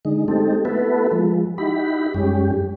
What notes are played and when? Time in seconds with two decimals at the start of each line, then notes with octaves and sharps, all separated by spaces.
0.05 D3 G#3 D#4
0.28 G#3 A3 C4 D#4 G4 A4
0.65 A3 B3 E4 F#4 A4 B4
1.11 F3 G#3
1.58 D#4 E4 F#4 G4 B5
2.14 F#2 G3 G#3 C#4 G4